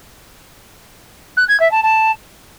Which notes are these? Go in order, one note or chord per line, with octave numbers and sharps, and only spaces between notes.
F#6
G#6
E5
A5
A5